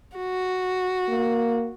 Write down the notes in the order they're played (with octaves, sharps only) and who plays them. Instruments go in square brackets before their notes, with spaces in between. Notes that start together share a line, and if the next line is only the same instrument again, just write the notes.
[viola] F#4
[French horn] A#3